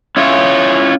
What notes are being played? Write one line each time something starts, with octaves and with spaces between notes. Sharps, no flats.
C#4 E4 F4 C#5